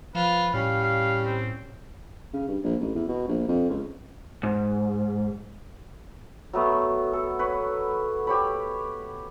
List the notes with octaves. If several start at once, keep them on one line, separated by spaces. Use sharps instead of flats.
F3 F4 B4
A2 G3 C#4 F5
F5
C4
C#3
G2
A#1
A1
E2
B2
A#1
F2
C#2
G#2
F#3 A3 B3
A4
B4 C#5
G4 C#5 B5